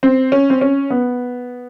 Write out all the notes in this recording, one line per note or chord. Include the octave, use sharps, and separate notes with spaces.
C4
C#4
C4
C#4
B3